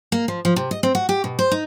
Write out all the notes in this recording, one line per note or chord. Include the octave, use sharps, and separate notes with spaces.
A#3
F3
F3
C3
D#5
C4
F#4
G4
B2
C5
D#4